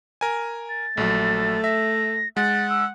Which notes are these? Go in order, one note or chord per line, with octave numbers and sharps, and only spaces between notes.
A#4 G#5
A6
A#1 F#3 A3
E5 A#6
G#3 F#5 A6
E6